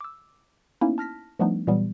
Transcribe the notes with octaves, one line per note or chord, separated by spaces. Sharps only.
D6 E6
A#3 B3 C#4 D#4 E4
A5 F6 A#6 B6
F3 G3 A3 B3 D4 D#4
A#2 E3 F#3 G3 B3